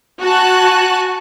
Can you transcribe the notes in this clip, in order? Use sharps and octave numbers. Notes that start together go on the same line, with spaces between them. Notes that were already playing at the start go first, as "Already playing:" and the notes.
F#4 G#5 A5 C#6 F#6